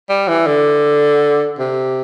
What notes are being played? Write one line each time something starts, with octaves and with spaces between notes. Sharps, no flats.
G3
E3
D3
C3